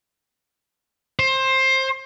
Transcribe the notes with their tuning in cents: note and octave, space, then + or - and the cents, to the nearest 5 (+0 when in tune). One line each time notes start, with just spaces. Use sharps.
C5 +20